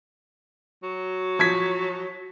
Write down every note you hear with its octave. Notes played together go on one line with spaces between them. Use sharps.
F#3
F3 G#6 B6